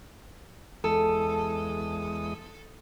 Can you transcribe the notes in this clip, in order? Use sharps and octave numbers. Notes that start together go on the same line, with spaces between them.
E2 G#3 A4 D#6